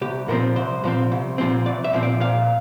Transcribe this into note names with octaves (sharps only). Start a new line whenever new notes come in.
C2 G4
A#2 F3 C4 A#4
C2 C5
A#2 F3 C4
C2
A#2 F3 C4
C2 D5
E5
A#2 F3 C4
D5
A#2 F5